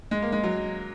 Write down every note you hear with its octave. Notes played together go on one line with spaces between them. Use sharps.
G#3
A#3
G#3
F#3